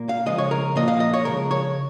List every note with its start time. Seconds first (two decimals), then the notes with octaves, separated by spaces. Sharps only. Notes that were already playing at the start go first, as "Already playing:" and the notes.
Already playing: A#2 A#3
0.09 F5
0.26 C#3 F3 G#3 D#5
0.38 C#5
0.51 A#4
0.76 A#2 F3 A#3 D#5
0.88 F5
1.00 D#5
1.14 C#5
1.25 C#3 F3 G#3 A#4
1.51 C#5